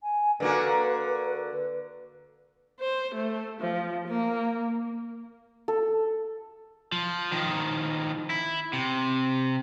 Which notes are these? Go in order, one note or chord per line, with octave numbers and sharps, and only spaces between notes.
G#5
D3 A#3 F#4 B4
C5
A3
F3
A#3
A4
F3
D#3 F3
E4
C3